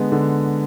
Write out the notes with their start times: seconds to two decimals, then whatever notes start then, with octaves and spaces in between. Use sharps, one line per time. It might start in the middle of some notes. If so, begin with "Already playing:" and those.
Already playing: D3 G#3 B3
0.12 D3